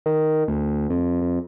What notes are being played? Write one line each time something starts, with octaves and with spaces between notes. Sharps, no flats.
D#3
D2
F2
F2